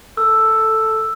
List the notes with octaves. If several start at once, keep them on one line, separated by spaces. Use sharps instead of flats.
A4 E6